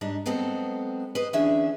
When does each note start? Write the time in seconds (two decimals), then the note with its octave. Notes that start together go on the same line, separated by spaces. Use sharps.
0.01 G#2 G3 D4 D#4
0.26 F#3 G#3 B3 C4 A4
1.15 B4 C5 D#5
1.33 D2 E3 C#4 D4 G#4 E5